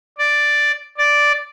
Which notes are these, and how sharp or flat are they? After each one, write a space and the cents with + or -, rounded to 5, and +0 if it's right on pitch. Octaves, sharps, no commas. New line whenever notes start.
D5 +0
D5 -5